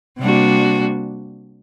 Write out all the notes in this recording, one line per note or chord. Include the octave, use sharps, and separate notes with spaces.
C3 G3 A#3 D4 F#4